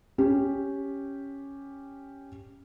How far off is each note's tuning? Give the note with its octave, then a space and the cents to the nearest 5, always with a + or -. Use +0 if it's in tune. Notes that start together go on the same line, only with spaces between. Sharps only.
C#4 +0 G4 +0